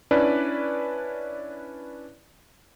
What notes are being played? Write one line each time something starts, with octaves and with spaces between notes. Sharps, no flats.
C#4 D4 E4 B4 D5